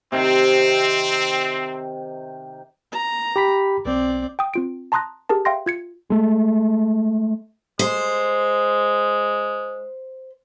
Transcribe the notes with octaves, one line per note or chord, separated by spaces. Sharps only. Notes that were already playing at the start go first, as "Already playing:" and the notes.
C3 D#3 C4
A#5
G4 B5 B6
B1 C4 D5
G5 D#6
C4 F4 D7
A5 A#5 C6 D#6 F#6 A#6
G4 G#4 A#4 A5
E5 F5 G5 C6 A#6
F4 G#6 C#7
G#3 A3
G#3 C5